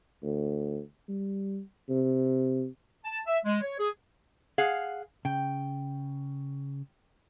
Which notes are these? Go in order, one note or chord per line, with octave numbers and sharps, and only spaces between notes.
D2
G3
C3
A5
E5
G#3
C#5
G#4
G#4 F5 F#5
C#3 G5